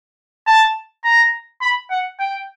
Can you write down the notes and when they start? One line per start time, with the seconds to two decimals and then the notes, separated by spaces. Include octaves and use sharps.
0.47 A5
1.04 A#5
1.61 B5
1.90 F#5
2.20 G5